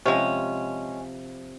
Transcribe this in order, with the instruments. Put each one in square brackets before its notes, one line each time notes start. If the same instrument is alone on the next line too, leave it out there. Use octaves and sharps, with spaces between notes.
[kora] C3 F3 [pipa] G#3 C#4